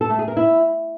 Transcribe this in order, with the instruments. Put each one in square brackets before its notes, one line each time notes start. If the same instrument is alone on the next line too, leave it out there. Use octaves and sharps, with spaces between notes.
[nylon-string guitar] A4
A3
G#4
A#4
E4